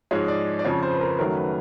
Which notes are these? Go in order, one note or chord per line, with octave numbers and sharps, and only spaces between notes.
G#2 F3 G#3 C#5
D5
D5
F2 C#3 F3 C#5
C5
B4
A#4
F#2 D#3 F#3 A3 A#4
B4